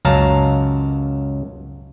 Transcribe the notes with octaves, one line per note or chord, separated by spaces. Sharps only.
C#2 F#2 F#3 F5 A5 A#5